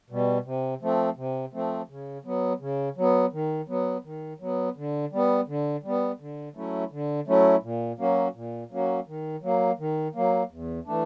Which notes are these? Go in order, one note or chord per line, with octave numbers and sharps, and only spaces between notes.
B2 G3
C3
F3 A3 C4
C3
F3 A3 C4
C#3
F#3 B3
C#3
F#3 B3
D#3
F#3 B3
D#3
F#3 B3
D3
G3 B3
D3
G3 B3
D3
F#3 A3 C#4 E4
D3
F#3 A3 C#4 E4
A#2
F#3 A#3 C#4 F#4
A#2
F#3 A#3 C#4 F#4
D#3
F#3 A#3
D#3
F#3 A#3
E2
E3 A3 D4